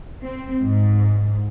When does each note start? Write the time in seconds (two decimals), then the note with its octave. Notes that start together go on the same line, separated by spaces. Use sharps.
0.22 C4
0.61 G#2